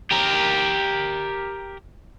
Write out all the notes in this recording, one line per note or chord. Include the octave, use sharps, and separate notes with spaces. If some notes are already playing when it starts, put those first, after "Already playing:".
G4 A#4